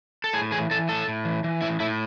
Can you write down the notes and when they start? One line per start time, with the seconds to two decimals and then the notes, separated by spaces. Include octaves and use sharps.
0.24 A4
0.34 A2 G#4
0.52 E3 G#4
0.71 E3 A4
0.89 A2 A4
1.08 A2
1.25 E3
1.44 E3
1.62 A2 E4
1.80 A2 E4